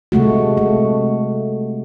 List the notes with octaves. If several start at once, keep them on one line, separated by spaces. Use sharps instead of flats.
C3 G#3 A3 F#4
A3